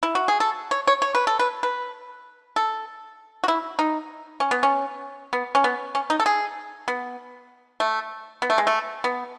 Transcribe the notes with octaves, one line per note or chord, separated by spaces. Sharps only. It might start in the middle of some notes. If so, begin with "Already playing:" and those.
E4
F#4
G#4
A4
C#5
C#5
C#5
B4
A4
B4
B4
A4
F#4
E4
D#4
C#4
B3
C#4
B3
C#4
B3
C#4
D#4
A4
G#4
B3
A3
B3
A3
G#3
A3
B3